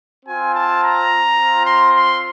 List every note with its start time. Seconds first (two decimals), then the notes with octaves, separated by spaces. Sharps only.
0.24 C4 F4 G#5
0.52 A5
0.80 A#5
1.37 C4 F4
1.65 C6
1.93 C6